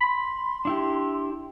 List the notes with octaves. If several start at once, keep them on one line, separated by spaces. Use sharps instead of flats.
B5 C6
D4 E4 G4